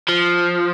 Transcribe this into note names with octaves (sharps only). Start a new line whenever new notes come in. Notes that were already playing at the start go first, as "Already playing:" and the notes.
F3